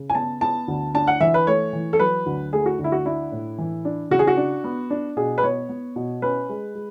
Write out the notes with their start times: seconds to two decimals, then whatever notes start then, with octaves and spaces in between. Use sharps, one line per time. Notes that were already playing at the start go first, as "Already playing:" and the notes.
Already playing: C#3
0.10 G#5
0.15 B3 A5
0.41 B3 A5
0.68 D2
0.94 D4 A5
1.08 F#5
1.20 E3 E5
1.34 B4
1.47 A3 C#5
1.73 E3
1.93 A4
2.00 F#3 B4
2.26 D2
2.53 A3 G#4
2.66 F#4
2.79 D2
2.84 E4
2.92 F#4
3.05 D4 E4
3.32 A2
3.58 E3
3.85 D4
4.11 C#3 F#4
4.19 G#4
4.27 F#4
4.37 D4
4.64 B3
4.90 D4
5.17 B2 G#4
5.38 B4
5.43 B3 C#5
5.69 B3
5.96 B2
6.22 C#4 B4
6.49 G#3
6.75 G#3